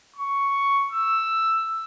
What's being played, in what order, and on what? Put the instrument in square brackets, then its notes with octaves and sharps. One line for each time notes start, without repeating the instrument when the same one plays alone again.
[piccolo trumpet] C#6
E6